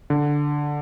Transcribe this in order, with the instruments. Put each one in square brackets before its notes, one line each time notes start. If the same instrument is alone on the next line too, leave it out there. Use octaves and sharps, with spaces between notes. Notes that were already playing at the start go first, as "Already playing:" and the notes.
[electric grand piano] D3